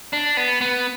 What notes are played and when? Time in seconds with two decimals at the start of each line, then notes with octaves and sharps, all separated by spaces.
0.13 D4
0.37 B3
0.61 B3